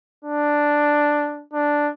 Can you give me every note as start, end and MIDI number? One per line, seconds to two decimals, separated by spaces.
0.25 1.44 62
1.53 1.90 62